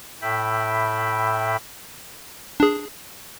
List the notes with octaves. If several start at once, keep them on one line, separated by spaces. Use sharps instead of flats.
A2 E5 G5 B5
D4 G#4